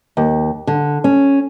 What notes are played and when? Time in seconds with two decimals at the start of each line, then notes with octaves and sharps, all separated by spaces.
0.17 D#2
0.67 D3
1.04 C#4